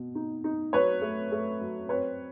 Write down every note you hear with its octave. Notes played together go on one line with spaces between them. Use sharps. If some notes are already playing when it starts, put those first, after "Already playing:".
Already playing: B2
D#4
D#4
F#3 B4 C#5
A3
A3
F#3
C4 B4 C#5